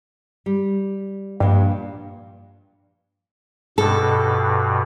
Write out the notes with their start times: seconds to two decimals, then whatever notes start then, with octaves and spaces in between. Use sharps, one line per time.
0.46 G3
1.40 G2 A#2 F3
3.78 G2 B2 A4